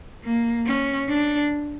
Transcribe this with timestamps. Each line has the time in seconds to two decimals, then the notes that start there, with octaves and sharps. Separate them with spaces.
0.24 A#3
0.66 C#4
1.09 D4